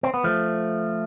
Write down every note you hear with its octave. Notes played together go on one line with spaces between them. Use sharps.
C4
B3
F3 A3